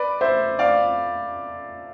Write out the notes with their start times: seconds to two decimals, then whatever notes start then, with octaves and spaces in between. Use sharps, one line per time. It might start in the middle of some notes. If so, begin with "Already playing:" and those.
Already playing: B4 D5
0.21 C5 E5
0.59 D5 F5